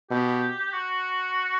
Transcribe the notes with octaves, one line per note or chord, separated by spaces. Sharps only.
B2 G4
F#4